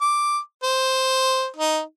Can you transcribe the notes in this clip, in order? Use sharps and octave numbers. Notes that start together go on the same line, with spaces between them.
D6
C5
D#4